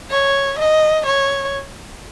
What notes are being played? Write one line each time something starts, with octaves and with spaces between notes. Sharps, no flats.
C#5
D#5
C#5